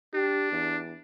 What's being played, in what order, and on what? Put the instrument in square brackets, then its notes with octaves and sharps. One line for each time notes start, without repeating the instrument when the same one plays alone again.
[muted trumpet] D4 [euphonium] G4
[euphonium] E2